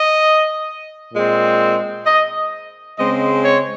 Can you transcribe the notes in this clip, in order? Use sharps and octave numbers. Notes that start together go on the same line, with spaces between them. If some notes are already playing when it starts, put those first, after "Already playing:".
Already playing: D#5
A#2 G#3 C4
D#5
C#3 G#3 C4 D#5
C#5